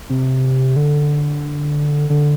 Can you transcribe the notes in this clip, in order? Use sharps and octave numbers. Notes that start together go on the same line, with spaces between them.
C3
D3
D3